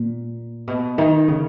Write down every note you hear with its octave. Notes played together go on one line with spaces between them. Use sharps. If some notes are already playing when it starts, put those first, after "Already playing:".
Already playing: A#2
B2
D#3
C#3